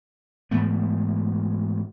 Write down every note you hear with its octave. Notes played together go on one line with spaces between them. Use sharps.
G#2 E3 A3 B3